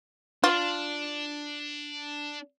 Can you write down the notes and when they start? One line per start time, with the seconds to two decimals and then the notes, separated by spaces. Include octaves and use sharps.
0.44 D4 F4